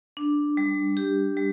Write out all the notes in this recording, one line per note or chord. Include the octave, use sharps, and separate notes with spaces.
D4
G3
G4
G3